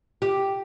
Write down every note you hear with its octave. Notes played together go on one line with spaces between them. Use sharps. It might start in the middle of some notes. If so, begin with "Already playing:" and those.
G4